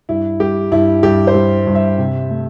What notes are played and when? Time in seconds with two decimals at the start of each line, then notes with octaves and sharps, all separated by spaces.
0.09 G2 E4
0.40 G3 G4
0.72 G2 E4
1.03 G2 G4
1.27 C5
1.35 G3
1.67 G2
1.75 E5
1.98 C3
2.30 A3